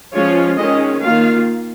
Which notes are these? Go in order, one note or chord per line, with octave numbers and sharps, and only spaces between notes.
F3 G#3 C#4 F4 C#5
D#3 G#3 C#4 D#5
D#3 A#3 F4 F5